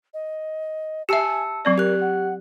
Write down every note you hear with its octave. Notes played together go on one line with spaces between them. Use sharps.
D#5
G4 E5 G#5 A5 E6 C#7
F#3 C4 D5 C#6
G4 A#4 F#6
F#5